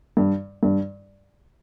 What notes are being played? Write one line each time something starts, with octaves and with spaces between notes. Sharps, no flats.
G2
G2